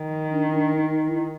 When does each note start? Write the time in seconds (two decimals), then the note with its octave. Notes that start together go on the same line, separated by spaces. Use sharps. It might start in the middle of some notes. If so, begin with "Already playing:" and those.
Already playing: D#3
0.32 D4
0.51 D#4
0.55 D4
0.74 D#4
0.90 D#4
1.09 E4